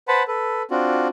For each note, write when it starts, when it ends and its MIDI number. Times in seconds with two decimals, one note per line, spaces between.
0.08 0.23 71
0.08 0.23 72
0.08 0.23 78
0.08 0.23 81
0.08 0.23 83
0.28 0.63 69
0.28 0.63 71
0.71 1.08 60
0.71 1.08 62
0.71 1.08 65
0.71 1.08 66